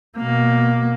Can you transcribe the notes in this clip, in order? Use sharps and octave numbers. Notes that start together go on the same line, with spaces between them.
B2 A#3